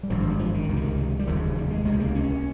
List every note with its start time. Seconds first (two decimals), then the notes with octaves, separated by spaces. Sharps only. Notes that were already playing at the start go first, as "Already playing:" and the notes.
0.03 G3
0.10 G#1 G2 F3
0.20 F3
0.30 G3
0.39 F3
0.54 D#3
0.69 C#2 C3
0.76 D#3
1.19 G3
1.27 F1 D#2 C#3 F3
1.57 G3
1.70 G#3
1.85 C#2 C3 G#3
2.00 A#3
2.15 C#4